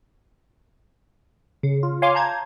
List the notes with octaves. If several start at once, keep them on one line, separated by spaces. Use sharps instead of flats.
C#3
F4
C#5 F5 G#5 C6 D6
A5 A#5 G6 G#6